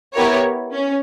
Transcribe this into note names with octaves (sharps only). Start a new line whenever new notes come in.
B3 E4 G4 A#4 C#5
C#4